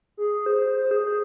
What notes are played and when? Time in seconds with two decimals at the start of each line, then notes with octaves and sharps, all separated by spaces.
0.17 G#4
0.46 C5
0.76 C5
0.91 G#4
1.06 G#4